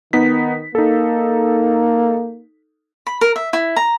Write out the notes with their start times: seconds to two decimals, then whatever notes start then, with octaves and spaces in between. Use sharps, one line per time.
0.13 D#3 B3 D#4 B6
0.75 A#3 D#4 A4
3.07 B5
3.21 A#4
3.36 E5
3.53 E4
3.76 A#5